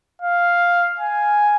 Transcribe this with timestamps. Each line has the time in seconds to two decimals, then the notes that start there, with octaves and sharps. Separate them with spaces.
0.22 F5
1.00 G#5